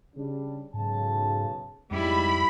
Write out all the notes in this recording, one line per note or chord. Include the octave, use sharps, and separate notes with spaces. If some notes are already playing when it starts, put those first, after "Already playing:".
C#3 G3 D4
B1 G#2 C#3 A5
F2 G#2 C3 G3 G#3 E4 B5